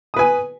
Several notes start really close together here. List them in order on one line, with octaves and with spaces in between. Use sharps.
D#6 B4 G#5